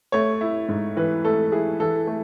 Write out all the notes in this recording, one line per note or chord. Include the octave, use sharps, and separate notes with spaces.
A3 C#5
E4
G#2
E3 B4
A3 A4
E4 G#4
E3 A4
A3